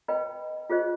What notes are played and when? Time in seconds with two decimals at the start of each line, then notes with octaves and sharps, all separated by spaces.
0.08 B4 D#5 G5 B5
0.70 F4 G#4 C5 D#5